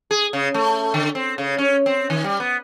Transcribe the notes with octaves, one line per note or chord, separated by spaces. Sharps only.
G#4
C#3
A3
D3
C4
C#3
C#4
C4
D#3
G3
B3